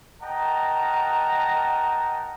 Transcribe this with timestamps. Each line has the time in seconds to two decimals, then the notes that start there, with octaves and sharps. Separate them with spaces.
0.22 A#4 D#5 F#5 G5 A5 A#5